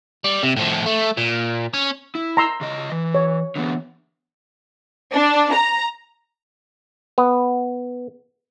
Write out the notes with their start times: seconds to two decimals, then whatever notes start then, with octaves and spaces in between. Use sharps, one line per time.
0.24 G3
0.43 C3
0.56 A2 F3
0.86 A3
1.17 A#2
1.74 C#4
2.15 E4
2.37 A#5 C6 E6
2.61 C#3 D#5
2.92 E3
3.15 C#5
3.56 D3 E3 B3
5.14 D4
5.55 A#5
7.18 B3